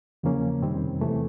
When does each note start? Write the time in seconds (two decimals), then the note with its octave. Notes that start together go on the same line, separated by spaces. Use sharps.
0.23 E2 C#3 F3 A#3 C#4
0.62 F2 C3 D#3 G3 C4
1.01 E2 C3 E3 A3